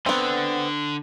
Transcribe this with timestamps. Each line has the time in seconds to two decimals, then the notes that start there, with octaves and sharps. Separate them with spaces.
0.06 D3 B3 C4